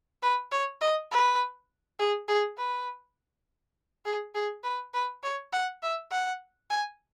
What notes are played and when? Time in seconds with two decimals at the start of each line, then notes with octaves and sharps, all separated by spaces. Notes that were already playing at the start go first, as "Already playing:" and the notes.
0.22 B4
0.52 C#5
0.81 D#5
1.11 B4
1.99 G#4
2.28 G#4
2.57 B4
4.05 G#4
4.35 G#4
4.63 B4
4.94 B4
5.23 C#5
5.53 F#5
5.82 E5
6.11 F#5
6.70 G#5